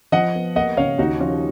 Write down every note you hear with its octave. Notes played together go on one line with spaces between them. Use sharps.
F3 D#5 F#5
B3
A#3 D#5 F#5
C#3 C#5 F5
D#2 D#4 F#4
F3 C#4 F4